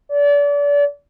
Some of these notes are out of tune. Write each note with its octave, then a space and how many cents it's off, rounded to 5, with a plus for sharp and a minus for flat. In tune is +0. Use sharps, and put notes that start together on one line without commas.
D5 -35